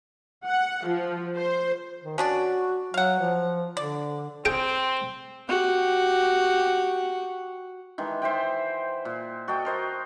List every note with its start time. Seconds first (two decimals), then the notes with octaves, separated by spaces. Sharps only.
0.46 F#5
0.86 F3
1.36 C5
2.04 D#3
2.18 C#4 D4 F#4 D5
2.94 F#3 F5 F#5
3.20 F3
3.77 D3 D5
4.45 C4 G#4 G5
5.49 F#4 G4
7.98 D#3 E3 G#3
8.22 C5 E5 F#5 G5
9.05 A#2
9.48 F#4 A4 D#5 G5
9.65 A#4 C5 D#5